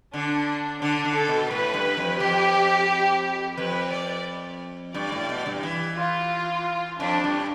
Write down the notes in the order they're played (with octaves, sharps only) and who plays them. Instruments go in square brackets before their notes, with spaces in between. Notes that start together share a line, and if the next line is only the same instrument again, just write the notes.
[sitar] D3 [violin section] D4
[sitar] D3 [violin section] D4
[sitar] D3
[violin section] A4
[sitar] B2
[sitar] A2 [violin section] B4
[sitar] G2
F2
[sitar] F2 [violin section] G4
[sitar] F2 [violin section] B4
[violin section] D5
[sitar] G2 [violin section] D5
[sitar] A2
B2
G2
E3
[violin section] F4
[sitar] F2 [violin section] D4
[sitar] G2